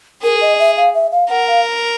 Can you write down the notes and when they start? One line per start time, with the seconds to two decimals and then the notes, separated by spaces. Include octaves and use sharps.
0.24 G#4 A#4
0.41 D#5
0.59 E5
0.77 F5
0.94 E5
1.12 F5
1.30 A#4 F#5
1.48 F5